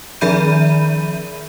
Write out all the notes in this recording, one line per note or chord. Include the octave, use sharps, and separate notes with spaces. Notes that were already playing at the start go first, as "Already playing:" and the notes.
D#3 F3 E5 B5 G6 D#7